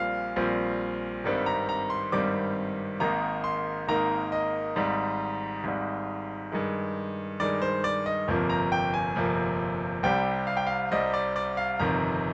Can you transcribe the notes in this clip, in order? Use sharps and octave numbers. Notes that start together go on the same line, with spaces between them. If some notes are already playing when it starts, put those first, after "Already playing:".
Already playing: A#1 A#2 G3 C4 F5
A#1 A#2 G3 C4
G#1 G2 D#3 G3 C4
A#5
A#5
C6
G#1 G2 D#3 G3 C4 D6
G#1 G#2 D#3 A#3 D#4 A#5
C6
G#1 G#2 D#3 A#3 D#4 A#5
D#5
G#1 G#2 G3
G#1 G#2 G3
G2 D#3 G#3
G2 D#3 G#3 D5
C5
D5
D#5
G1 F2 C3 F3 A#3
A#5
G5
G#5
G1 F2 C3 F3 A#3
C2 C3 G3 C4 G5
F5
G5
F5
C2 C3 G3 C4 D#5
D5
D5
F5
G1 F2 C3 D#3 A#5